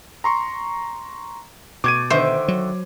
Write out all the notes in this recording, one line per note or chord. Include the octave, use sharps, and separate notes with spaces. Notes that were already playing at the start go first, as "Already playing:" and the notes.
A#5 C6 C#6
B2 A3 D6 G#6 D#7
D3 D#3 C5 E5
F#3